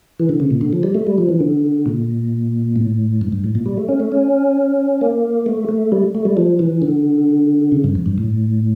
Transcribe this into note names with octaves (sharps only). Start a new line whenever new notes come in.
E3
D3
C#3
A#2
D3
F3
G3
A3
G3
F3
E3
D3
A#2
A2
G2
G2
A2
A#2
G3
A3
C#4
A3
C#4
A#3
A3
A3
G3
A3
G3
F3
E3
D3
C#3
G2
F2
G2
A2